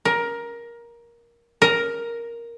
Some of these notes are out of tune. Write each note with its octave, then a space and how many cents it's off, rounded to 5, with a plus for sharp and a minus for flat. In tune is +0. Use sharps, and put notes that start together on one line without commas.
A#4 +15
A#4 +5